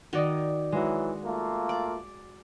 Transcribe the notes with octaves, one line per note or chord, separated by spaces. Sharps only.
D#3 F#4 D5 D#5
E3 F#3 G#3 E4 F#4
A3 A#3 F4
D5